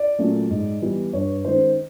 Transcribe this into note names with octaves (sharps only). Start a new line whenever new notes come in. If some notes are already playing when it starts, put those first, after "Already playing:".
Already playing: D5
A#2 F#3 A3 C#4
G#2
E3 G3 B3
G2 C#5
D#3 G#3 C#4 C5